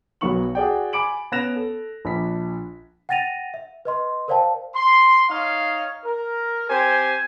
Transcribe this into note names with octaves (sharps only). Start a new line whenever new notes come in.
B1 F#3 B3 D#4 C#6 F#7
F#4 G#4 D5 G5
G#5 B5 D6 D7 F#7
B3 C#4 F#6 A#6 E7 F7
A4
A#1 D4 B5 B6
F#5 G5 A6 A#6 D#7 F7
E5
B4 D#5 C6
A#4 C5 D5 F5 G5 A5
C6
D#4 C#5 F5
A#4
C4 G4 C5 G#5